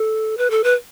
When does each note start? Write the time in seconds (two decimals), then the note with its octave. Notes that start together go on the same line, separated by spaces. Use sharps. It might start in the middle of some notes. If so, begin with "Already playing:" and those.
Already playing: A4
0.38 B4
0.50 A4
0.64 B4